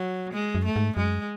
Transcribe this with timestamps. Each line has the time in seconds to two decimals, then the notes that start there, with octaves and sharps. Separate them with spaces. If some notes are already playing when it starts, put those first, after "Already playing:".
Already playing: F#3
0.33 G#3
0.55 F#2
0.65 A3
0.76 G#2
0.97 F#2 G#3